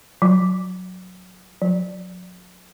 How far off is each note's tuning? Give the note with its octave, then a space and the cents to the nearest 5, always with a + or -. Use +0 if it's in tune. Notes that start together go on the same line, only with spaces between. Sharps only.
F#3 -10
F#3 -35